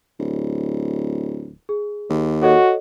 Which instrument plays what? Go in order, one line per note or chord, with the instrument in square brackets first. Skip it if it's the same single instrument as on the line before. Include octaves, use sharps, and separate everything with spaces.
[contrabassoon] D1
[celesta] G#4
[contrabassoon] D#2
[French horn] F#4 [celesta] A4 C#5 D#5